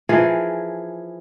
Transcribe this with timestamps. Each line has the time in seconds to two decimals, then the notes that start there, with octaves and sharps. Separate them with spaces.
0.09 E3 F3 G#4 A#4